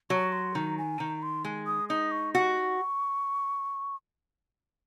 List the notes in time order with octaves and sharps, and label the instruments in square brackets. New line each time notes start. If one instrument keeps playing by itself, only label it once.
[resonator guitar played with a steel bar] F#3 [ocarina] C#6
[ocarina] C6
[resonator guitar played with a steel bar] D#3 [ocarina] A#5
[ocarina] G#5
[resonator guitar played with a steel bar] D#3 [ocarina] A#5
[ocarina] C6
[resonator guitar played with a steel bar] G#3
[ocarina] D#6
[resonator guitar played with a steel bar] D#4 [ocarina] D#6
[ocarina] C#6
[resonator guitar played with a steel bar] F#4 [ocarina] C#6